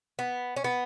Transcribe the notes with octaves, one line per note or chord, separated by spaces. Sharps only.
B3
C#4
B3